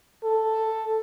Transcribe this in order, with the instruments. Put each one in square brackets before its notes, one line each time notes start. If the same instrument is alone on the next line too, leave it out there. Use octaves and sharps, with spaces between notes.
[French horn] A4